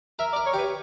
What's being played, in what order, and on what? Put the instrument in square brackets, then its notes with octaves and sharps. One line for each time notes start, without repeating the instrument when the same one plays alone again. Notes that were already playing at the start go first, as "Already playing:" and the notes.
[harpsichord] A#4 [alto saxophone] E5
[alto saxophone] D5
[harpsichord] A#4
[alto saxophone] C#5
[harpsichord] G4 [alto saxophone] B4